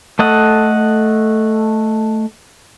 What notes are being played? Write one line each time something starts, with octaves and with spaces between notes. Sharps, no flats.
A3 A4 D#5 F#5